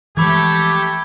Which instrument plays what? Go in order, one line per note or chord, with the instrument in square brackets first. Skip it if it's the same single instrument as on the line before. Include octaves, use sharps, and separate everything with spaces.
[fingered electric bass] E3 F3 G#3 [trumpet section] A3 G4 [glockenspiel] B5 D6 G#6